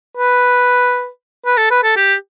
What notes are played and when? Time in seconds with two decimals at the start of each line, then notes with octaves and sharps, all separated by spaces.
0.17 B4
1.46 B4
1.58 A4
1.71 B4
1.83 A4
1.96 G4